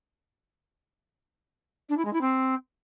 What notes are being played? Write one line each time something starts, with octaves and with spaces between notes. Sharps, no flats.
D4
E4
G#3
E4
C4